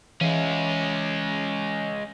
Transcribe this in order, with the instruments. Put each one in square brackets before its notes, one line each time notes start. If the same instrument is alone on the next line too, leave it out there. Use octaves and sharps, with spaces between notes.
[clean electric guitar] E3 E5 F5 [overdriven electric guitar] G#3 C#4